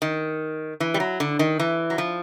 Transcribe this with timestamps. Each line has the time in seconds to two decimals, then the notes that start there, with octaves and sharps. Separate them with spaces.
0.02 D#3
0.80 E3
0.94 G3
1.00 F#3
1.20 D3
1.39 D#3
1.60 E3
1.90 F#3
1.98 F3